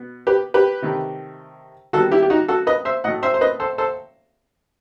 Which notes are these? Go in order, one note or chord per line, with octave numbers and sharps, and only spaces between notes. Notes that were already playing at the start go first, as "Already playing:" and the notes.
Already playing: B2 B3
G4 B4
G4 B4
C3 D#3 A3
D#3 G3 B3 F#4 A4
E4 G4
G4
D#4 F#4
F#4 A4
B4 D#5
C5 E5
A2 F#3 A3 D#5 F#5
C5 E5
C5
B4 D#5
A4 C5
A4 C5